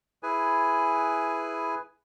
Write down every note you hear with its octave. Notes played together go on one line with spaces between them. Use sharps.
E4 G#4 B4 G#5